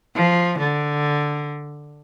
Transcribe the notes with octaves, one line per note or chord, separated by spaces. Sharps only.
F3
D3